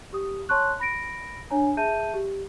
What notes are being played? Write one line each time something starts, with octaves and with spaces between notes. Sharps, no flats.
G4 D#6
C#5 A5 C6 C#6 F#6
B5 A#6 D7
D4 C#5 G#5 A#5
G#4 E5 A5 G6 D#7
G4